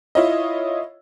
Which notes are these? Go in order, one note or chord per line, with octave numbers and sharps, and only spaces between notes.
E4 F4 C#5 D#5